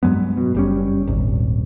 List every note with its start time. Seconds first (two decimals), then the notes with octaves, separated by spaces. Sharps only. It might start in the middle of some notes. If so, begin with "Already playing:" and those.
0.03 G2 F#3 G#3 B3
0.37 B2
0.55 F#1 G3 C#4
1.07 D#1 G#1